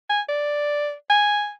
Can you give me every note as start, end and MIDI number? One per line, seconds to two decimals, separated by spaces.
0.09 0.21 80
0.29 0.93 74
1.10 1.51 80